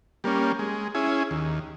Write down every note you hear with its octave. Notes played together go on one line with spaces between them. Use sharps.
G3 A#3 C#4
G#3
C#4 E4 G#4
D#2